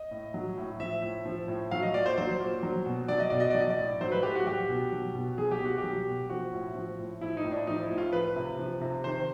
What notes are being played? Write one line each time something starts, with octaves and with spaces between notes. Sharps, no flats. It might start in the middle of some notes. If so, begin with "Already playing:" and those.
Already playing: D#5
A2
F#3
A2
F3 E5
A2
F3
A2
F#3 F5
D#5
A#2 D5
C5
F#3 C5
A#2
F#3
B2
F#3 D5
D#5
B2 D5
D#5
F#3 D5
D#5
D5
A2
F#3 C5
B4
A2 G4
F#4
F#3 G4
B2
F#3
B2
F#3 G#4
G4
B2 F#4
G4
F#3
B2
F3 F#4
A2
F3
A2
F3 E4
D#4
A2
D4
F3 D#4
E4
A2
F4
F3 B4
C3
F3
C3
D#3 C5